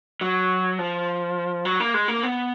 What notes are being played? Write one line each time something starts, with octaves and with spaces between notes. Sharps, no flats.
F#3
F3
F#3
A#3
G#3
A#3
B3